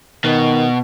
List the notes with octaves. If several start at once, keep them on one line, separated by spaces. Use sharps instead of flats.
B2 D#3